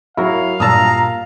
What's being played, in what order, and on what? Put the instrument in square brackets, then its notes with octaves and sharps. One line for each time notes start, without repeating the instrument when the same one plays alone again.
[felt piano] F#3 F#4 [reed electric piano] E4 A#4 [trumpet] F5
[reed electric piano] G2 A#2 A5 [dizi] A#5 [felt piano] D#6 E6